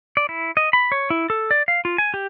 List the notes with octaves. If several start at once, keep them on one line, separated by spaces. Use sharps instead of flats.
D5
E4
D#5
B5
C#5
E4
A4
D5
F5
F4
G#5
G4